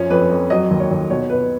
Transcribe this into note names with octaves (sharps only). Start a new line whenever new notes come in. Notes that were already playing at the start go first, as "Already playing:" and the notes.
Already playing: F#2 F3 C#4
F2 B4
F2
F#3 D#5
D#2
C#5
D#2
B2 C#5
B2 B4